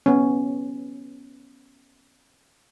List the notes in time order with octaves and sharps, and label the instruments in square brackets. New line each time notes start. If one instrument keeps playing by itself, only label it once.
[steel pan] B3 C#4